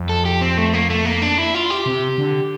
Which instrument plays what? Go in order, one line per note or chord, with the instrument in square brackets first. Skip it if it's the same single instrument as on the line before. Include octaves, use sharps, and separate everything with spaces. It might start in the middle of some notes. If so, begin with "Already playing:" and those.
Already playing: [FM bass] F2
[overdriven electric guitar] A4
G4
C4
A3
A#3
A3
A#3
D4
E4
F4
G4
[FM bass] C3
D3